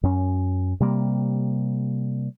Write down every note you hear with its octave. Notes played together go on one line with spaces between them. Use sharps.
F#2 C#4
C3 G3 A#3